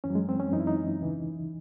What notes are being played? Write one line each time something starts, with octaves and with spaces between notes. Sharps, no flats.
F#2 E3 C#4
F#3
G#3
C4
C#4
F#2 E3 D#4
E4
D#4
D#2 C#3 E3